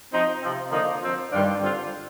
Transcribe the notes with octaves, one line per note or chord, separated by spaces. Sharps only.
F3 C4 D#4
C3 F3 C4
D3 F3 A#3 D#4
F3 C4 F4
G2 D#3 G3 D4 F4
D3 G3 C4 F4